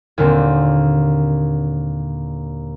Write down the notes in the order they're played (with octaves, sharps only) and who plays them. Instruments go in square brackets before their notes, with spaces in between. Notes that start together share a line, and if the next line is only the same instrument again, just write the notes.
[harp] D#2 A#2 D3 C4